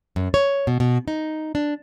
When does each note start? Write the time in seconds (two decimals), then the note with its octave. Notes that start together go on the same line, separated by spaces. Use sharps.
0.16 F#2
0.34 C#5
0.67 B2
0.80 B2
1.08 D#4
1.55 D4